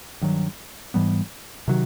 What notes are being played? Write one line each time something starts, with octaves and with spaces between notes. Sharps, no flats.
G2 D#3 F#3
G#2 E3 G3 B3
C3 D#3 F#3